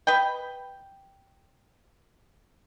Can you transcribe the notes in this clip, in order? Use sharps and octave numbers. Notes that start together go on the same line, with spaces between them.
B4 D#5 G5